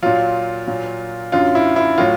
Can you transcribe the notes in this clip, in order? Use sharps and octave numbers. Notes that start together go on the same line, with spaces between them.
A#2 F#3 F4
A#2 F#3
F#2 D3 F#3 F4
E4
E4
A2 F#3 F4